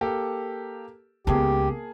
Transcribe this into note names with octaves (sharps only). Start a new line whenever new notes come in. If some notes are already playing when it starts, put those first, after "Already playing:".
A#3 G4 A4
C#2 A#3 B3 G4 G#4 A5